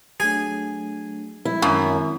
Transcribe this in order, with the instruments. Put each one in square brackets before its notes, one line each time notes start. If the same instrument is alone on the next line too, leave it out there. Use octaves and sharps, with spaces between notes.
[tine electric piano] F#3 A3 D4 [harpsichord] G#4 G#5
[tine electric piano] F3 G3 G#3 [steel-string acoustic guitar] E4
[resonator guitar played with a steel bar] F#2 [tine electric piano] D#3 G#3 C4